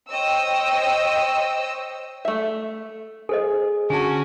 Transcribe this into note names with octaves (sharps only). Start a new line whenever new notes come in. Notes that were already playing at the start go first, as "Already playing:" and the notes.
C5 C#5 D#5 G5 E6
A3 E5
G#4 A4 C5 D#5
D3 C#4 F#4 G#5 A5